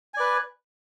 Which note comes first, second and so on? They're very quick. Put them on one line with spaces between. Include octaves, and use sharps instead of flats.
G#5 D5 B4